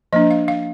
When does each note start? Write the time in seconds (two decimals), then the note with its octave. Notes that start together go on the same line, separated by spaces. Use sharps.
0.13 F3 A#3 D4 D#5
0.31 F5
0.48 F5